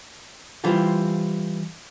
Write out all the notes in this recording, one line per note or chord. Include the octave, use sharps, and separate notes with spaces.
E3 G3 C4 F4 G4